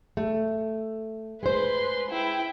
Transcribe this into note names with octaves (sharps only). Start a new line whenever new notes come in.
A3
G#3 B4 C5 C6
E4 G5